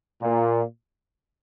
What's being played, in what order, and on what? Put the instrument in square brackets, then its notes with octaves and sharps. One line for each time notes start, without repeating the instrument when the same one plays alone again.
[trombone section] A#2